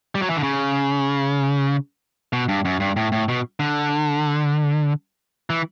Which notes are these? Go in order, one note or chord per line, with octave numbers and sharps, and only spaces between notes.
G3
F#3
E3
D3
C#3
B2
G2
F#2
G2
A2
A2
B2
D3
E3